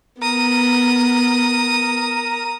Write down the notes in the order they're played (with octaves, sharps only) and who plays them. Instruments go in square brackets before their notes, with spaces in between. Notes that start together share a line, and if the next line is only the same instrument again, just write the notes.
[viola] B3 [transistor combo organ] A#4 A#5 [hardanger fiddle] D#6